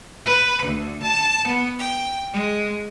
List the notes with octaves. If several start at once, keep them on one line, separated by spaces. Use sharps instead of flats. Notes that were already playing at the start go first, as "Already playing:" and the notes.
B4
D2
A5
B3
G5
G#3